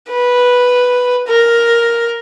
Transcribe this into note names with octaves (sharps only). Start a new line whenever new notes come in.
B4
A#4